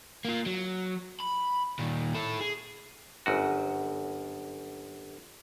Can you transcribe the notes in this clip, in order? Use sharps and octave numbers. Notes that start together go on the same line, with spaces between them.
A#3 F4
F#3
B5
A#2 D#3
E4 A4
G#4
G1 F#2 F#4